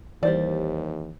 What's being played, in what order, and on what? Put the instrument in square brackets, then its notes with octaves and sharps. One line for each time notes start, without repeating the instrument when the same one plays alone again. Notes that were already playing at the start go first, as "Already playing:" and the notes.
[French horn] D#2 [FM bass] E3 [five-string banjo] G3 C5 D5